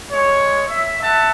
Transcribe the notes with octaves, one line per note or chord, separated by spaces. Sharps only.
G#3 C#5
E5
E5 F#5 A5